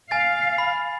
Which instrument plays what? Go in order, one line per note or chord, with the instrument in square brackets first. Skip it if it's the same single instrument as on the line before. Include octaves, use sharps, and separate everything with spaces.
[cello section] F5 [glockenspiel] G#5 A6
[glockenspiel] B5